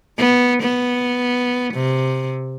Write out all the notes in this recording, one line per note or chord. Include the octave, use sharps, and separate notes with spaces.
B3
B3
C3